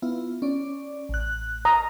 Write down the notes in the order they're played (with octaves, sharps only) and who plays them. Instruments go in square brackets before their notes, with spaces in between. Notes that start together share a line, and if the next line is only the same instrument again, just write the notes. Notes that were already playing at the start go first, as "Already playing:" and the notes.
[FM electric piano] B3 E4 F4
C#4 D5
A1 F#6
[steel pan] A#5 D#6